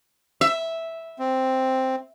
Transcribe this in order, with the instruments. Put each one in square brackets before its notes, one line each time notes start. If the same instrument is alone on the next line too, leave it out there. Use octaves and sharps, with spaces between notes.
[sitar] E5
[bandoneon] C4